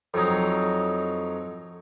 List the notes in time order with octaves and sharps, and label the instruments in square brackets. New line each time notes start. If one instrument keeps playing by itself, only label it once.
[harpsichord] F2 F#3 D#4